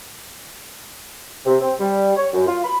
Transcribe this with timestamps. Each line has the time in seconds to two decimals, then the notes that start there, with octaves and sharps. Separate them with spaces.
1.46 C3
1.61 C4
1.80 G3
2.16 C#5
2.34 F#2
2.47 F4
2.64 B5